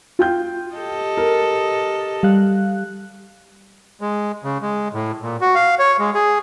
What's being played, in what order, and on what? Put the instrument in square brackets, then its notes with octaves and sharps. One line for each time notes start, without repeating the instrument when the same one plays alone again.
[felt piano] F4 G5 G6
[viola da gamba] G4 A4 D#5
[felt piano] A#4
[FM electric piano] G3 F5 F#6
[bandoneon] G#3
C#3
G#3
A2
A#2
F#4
F5
C#5
G#3
G#4